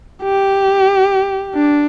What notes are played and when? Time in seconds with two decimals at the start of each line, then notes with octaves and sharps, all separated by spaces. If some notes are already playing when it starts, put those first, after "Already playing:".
0.23 G4
1.55 D4